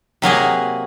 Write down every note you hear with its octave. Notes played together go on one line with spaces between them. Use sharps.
C3 F#3 A#3 G#4